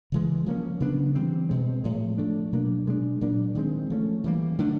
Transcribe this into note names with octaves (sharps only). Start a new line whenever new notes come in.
C#3 E3 G#3
F3 A#3 C#4
C#3 F#3 B3 D4
E3 G3 C4
B2 G#3 C4
A2 F3 G#3
F3 A3 D4
B2 F#3 A#3 D4
B2 G#3 B3 D4
A#2 F#3 A#3 D4
D#3 G#3 C4
F3 A3 C#4
E3 G3 A#3
D3 F#3 A3 D4